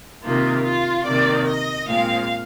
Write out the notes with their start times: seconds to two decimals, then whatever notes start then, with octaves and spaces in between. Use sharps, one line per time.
0.23 C3 D#3 A#3 F4
0.64 F4
1.06 C3 D#3 A#3 D5
1.47 D#5
1.88 A#2 G#3 C4 F5